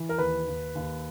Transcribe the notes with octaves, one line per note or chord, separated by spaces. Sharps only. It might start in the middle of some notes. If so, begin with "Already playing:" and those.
Already playing: E3
A#4
D#2 B4
D#2
D#2